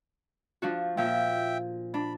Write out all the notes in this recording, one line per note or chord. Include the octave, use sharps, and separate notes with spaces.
F3 D4 F#4
A#2 F3 E5 G5
D4 B5